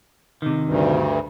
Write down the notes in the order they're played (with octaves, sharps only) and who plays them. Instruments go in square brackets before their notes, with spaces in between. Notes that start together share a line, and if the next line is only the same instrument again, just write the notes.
[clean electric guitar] C3 D#3
[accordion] D2 G2